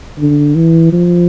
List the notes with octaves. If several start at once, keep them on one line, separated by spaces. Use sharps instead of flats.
D3
E3
F3